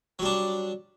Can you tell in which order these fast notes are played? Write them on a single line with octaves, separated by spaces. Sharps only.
F#3 G3 D4